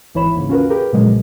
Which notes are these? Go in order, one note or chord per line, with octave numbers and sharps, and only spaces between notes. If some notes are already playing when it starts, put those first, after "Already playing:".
G#1 E3 E4 C#5 B5 E7
D#2 G#2 C#3
C#4 F4 F#4 A#4 B4
G4 G#4 A#4 B4
A#2 C#3 F3 F#3 G#3
B1